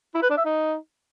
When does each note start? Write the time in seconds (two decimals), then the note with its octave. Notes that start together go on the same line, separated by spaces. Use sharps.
0.14 E4
0.22 B4
0.30 D4
0.37 E5
0.45 D#4